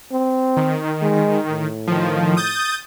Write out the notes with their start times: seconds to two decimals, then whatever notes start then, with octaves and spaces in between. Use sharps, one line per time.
0.12 C4
0.57 D#3
1.02 G#3
1.51 A2
1.87 D#3 F3
2.37 D#6 G6 A6